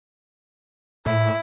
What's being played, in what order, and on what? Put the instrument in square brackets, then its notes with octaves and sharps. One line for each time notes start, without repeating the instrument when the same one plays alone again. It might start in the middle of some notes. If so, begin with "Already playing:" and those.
[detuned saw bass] A2 [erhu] E4